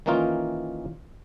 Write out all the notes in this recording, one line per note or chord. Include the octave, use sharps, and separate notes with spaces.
D#3 E3 A#3 C#4 D#4 F4